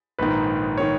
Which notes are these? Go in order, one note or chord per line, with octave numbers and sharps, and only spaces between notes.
A#1 G#2 D#3 B4
D#3 C#5